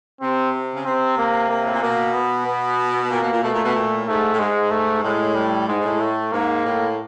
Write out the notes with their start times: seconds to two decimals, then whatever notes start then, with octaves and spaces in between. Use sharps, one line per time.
0.21 C3 C4
0.75 C#3
0.85 C3 C4
1.18 A#3
1.49 A#3
1.64 A2
1.73 A#2
1.82 B2 A#3
2.14 B3
2.46 B3
3.11 A#2 A#3
3.22 B2
3.32 A#2
3.42 B2 A3
3.53 A#2
3.64 B2
3.74 A#2
3.97 A2
4.07 G#2 A3
4.33 A2
4.39 G#2 G#3
4.71 A3
5.03 A2 G#3
5.35 G3
5.67 G#2 G#3
5.80 G#2
5.84 A2
6.00 A3
6.32 G#2 A#3
6.65 A2